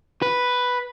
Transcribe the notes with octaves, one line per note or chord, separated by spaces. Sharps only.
B4